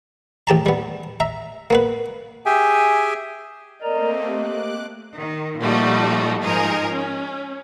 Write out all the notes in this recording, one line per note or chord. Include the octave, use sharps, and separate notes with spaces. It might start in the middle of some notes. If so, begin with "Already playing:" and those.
A1 G4 A5 A#5
G3 B3
E5 A#5
A#3 B3 B4
G4 G#4 E5 G5 G#5
A3 A#3 C4 A#4 D5 D#5 A#5
A#3 G4 D6 F#6
D#3
A#2 F3 G3 A3 D#4 F#4
G#2 F3 D#4 G#4 A#4
C#4